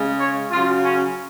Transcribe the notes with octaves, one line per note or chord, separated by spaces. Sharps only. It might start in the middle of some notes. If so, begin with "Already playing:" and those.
Already playing: C#3 G#3
C#5
C#3 F#3 F4
C#4